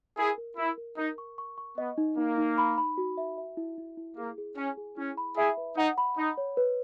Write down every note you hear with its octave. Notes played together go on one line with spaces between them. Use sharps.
E4 G#4 A#4
A#4
E4 A#4
A#4
D#4 A#4
C#6
C#6
C#6
B3 D#5
D#4
A#3 D#4
D#4
B5
B5
F#4
E5
E5
E4
E4
E4
A#3 G#4
G#4
C#4 G#5
G#4
C#4 E4
B5
E4 G#4 E5
B4
D#4 F#5
B5
D#4 B5
C#5
B4